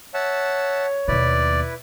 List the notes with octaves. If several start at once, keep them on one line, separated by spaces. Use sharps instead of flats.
C#5 E5 F#5 A5
D#2 B2 E4 B4 D5